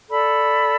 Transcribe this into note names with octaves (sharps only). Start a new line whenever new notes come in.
A4 D5 B5